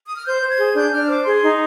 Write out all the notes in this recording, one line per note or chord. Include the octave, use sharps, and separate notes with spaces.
D#6
F6
C5 G6
C5
G#6
G#4
D4 G6
D4 F6
C5 D6
G#4 C6
D#4